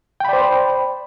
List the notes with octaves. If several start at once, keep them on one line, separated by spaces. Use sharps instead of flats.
C5 D5 G5 B5